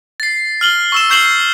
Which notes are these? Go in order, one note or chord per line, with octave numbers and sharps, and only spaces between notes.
A6 C7
F6 F#7 G7
C#6 E6 E7
C#6 G6 C7 E7 F#7 G7